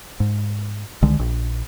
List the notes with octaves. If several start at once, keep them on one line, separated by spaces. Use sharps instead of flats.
G#2
C2 D3 D#3 G#3
A#1